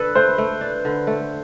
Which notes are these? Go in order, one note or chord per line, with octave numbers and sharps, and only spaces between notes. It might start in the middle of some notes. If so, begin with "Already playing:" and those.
Already playing: D4 A4 B4
A3 C5
A3
D4
D3
A3